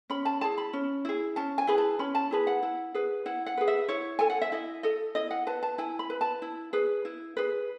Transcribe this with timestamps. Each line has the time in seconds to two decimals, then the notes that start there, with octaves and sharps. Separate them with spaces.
0.10 C#4 B5
0.25 A5
0.41 E4 G#4 A5
0.58 B5
0.73 C#4
1.05 E4 G#4
1.36 C#4 A5
1.58 G#5
1.67 E4 G#4 B4
1.78 A5
1.99 C#4 B5
2.15 A5
2.31 E4 G#4 B4
2.47 F#5
2.62 E4
2.94 G#4 B4
3.26 E4 F#5
3.46 F#5
3.57 G#4 B4
3.68 E5
3.88 E4 C#5
4.19 A4 G#5
4.30 F#5
4.42 E5
4.52 E4 D#5
4.83 A4 D#5
5.15 E4 D#5
5.31 F#5
5.47 B4 A5
5.63 A5
5.78 E4 G#5
5.99 B5
6.10 B4
6.21 A5
6.42 E4
6.73 G#4 B4
7.05 E4
7.37 G#4 B4